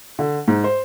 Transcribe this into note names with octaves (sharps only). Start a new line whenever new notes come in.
D3
G#2
C5